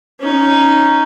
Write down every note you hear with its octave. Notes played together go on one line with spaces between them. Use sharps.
C#4 D#4